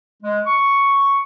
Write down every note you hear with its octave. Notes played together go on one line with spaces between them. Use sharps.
G#3
C#6